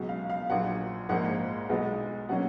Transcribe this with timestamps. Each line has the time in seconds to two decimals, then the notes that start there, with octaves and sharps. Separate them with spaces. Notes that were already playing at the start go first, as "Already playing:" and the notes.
Already playing: C#2 B2 F#3
0.09 F5
0.30 F5
0.50 A#1 A#2 F#3 F#5
1.09 A#1 G#2 F3 A#3 F#5
1.69 B1 B2 G#3 B3
2.29 B2 F#3 A#3 C#4 F#5